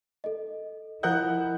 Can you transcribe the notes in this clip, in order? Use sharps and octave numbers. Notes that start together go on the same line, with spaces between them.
A4 D#5
F3 E4 A#4 D#5 F#5 D#6 F#6 G6